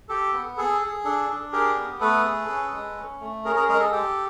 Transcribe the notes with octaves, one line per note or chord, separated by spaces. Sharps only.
G4 A4
B3
G#4 A4
G#4
D4 A4
D4
G4 G#4 A#4
B3
A3 A4 B4
G#4
C#4
G#3
C#4
A3
C#4 G#4 A#4
G#4 A#4
G#3 G#4 A#4
A4
G4 A4